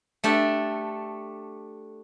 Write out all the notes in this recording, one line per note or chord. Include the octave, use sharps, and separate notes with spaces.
A3 D4 G4 A4